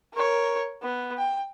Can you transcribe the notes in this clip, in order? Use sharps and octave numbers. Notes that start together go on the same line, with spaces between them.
A#4 C#5
B3
G5